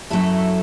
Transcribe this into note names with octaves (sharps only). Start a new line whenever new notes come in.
F#2 F#3 A3 E4 A4